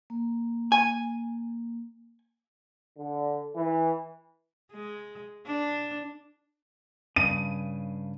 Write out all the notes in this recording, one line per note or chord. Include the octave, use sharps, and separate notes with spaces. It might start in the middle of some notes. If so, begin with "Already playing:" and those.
A#3
G#5
D3
E3
G#3
D4
G2 C#3 D#7